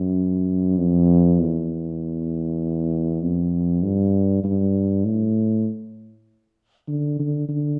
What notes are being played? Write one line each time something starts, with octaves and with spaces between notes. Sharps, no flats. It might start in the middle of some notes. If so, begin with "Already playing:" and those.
Already playing: F#2
F2
E2
F2
G2
G2
A2
D3
D3
D3